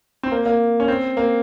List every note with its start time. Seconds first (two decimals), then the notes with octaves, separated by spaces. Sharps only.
0.23 C4
0.32 A#3
0.46 A#3
0.80 C#4
0.88 C4
1.17 A#3